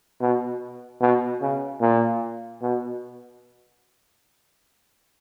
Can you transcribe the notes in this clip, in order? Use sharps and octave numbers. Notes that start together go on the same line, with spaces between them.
B2
B2
C#3
A#2
B2